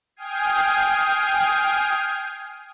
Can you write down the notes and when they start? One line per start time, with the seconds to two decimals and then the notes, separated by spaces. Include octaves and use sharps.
0.16 G5 G#5 D#6 F6 G#6 C7